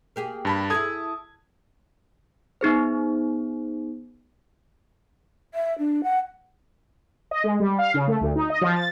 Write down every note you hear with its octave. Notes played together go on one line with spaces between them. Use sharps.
A#3 G4 G#4
G2 A5 B5
E4 G#4 A4 A5 D#6 G#6
B3 D#4 G#4 C5
E5
D4
F#5
D#5
G#3
G3
F5
C#3
A3
D2
D#4
D#5
F3
A6